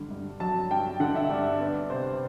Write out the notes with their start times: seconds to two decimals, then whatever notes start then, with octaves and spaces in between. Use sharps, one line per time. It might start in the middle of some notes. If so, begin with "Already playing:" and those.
Already playing: G2 D3
0.11 G2
0.40 F#3 A5
0.71 G2 G5
1.00 D3 F#5
1.15 E5
1.29 G2 D5
1.60 B3 D5
1.89 C3 C5